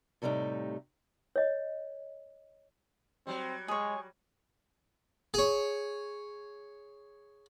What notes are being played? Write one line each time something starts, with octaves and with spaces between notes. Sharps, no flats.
A2 C3 G3 A3 D#4
C#5 D#5
F#3 G3 C4
G#3 G#4 C#5
G#4 C#5